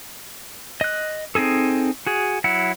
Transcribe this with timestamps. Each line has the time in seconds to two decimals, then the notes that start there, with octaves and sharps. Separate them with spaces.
0.81 D#5 F#6
1.35 C4 D#4 G#4 A4
2.07 F#4 G#4
2.44 F#3 E4 F#5